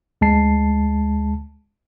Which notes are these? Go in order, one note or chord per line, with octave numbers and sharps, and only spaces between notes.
D2 G#3 A5 C7